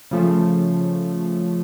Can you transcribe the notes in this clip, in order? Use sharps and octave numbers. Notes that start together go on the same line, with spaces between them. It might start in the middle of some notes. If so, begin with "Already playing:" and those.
C#3 F3 A3